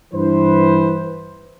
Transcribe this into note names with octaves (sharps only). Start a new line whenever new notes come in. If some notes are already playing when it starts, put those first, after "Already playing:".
G2 E3 B4 C5